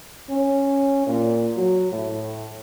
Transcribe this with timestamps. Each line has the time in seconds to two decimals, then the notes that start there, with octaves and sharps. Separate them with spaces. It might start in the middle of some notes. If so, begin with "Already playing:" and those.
0.29 C#4
1.07 A#2
1.56 F#3
1.92 A2